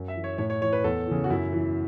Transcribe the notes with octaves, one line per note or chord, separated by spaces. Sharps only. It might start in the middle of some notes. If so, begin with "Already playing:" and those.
Already playing: F#2
E5
E3
C#5
A2 C#5
C#5
E3 C#5
B4
E2 A4
C#3 E3
F#4
F#2 E4
E3